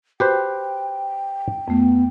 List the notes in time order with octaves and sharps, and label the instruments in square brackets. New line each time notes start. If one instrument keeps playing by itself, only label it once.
[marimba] F#4 [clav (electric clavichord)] G4 B4 C5 [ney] G5
[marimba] F2 A3 [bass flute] B3